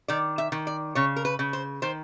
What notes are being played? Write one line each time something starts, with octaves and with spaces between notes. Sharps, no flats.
D#3 D5
E5
D#3
D5
C#3 C#5
A#4
B4
C#3
C5
D#3 C5